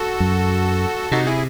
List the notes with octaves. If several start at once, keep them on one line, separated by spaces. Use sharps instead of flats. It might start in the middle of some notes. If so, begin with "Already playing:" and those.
Already playing: F#4 A4
F#2
C3 D#4 F#4
E4 G#4